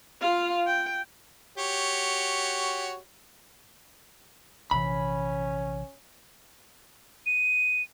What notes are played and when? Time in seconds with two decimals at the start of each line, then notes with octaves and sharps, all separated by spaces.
0.21 F4 F5
0.67 G5
1.58 F#4 G4 C#5
4.71 A#1 C3 E3 C#4 B5
7.26 D#7